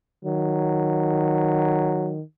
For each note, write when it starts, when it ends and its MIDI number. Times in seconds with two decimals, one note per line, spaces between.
0.25 2.22 51
0.25 2.14 54